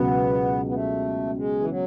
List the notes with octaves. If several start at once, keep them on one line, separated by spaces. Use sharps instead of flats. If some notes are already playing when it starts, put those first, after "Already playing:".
Already playing: C#2 B2 F#3 B3
B3
A3
G#3
E3
F#3